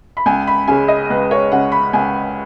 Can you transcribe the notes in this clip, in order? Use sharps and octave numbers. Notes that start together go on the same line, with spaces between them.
B5
C#2 G#5
B5
C#3 G#3 G#5
D#5
C#2 B4
C#5
C#3 G#3 F#5
B5
C#2 G#5